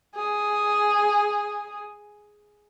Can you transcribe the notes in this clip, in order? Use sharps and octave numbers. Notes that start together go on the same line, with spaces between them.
G#4